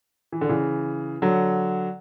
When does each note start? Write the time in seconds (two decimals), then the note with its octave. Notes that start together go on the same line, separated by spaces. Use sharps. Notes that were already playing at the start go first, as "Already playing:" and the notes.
0.32 E3
0.41 D3
0.49 C#3 E3
1.22 D3 F#3